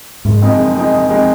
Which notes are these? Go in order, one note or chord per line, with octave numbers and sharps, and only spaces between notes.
F#1 G#2
F2 F3 G#3 D#4
F#1
F2 F3 G#3 D#4
F#1
F2 F3 G#3 D#4